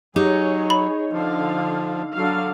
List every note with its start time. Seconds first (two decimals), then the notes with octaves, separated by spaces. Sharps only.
0.16 F#3 D#4 G4 G#4 C#5
0.70 B5
1.13 D3 F3 F5
2.14 D3 F#3 F5